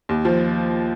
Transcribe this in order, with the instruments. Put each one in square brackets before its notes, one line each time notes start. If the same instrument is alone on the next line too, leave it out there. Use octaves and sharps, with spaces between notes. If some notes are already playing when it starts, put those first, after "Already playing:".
[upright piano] D#2
F3